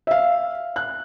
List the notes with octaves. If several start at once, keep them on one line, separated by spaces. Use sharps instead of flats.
E5 F5
F#6